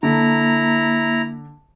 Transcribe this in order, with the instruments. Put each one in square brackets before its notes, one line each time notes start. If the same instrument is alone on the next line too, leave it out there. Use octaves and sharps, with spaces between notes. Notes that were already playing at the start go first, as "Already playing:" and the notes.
[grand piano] D3 [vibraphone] A#3 [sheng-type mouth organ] E4 A#5